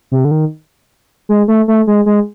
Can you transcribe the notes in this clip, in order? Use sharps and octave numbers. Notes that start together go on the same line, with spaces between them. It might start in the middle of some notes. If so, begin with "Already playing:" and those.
C3
D3
D#3
G#3
A3
A3
G#3
G#3